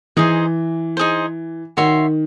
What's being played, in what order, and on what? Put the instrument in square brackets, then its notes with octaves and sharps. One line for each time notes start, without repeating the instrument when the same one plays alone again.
[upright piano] E3 [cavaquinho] D#4 G#4 C5
[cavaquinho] D#4 G#4 C5
[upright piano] D#3 [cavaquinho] F#4 C#5 E5 C6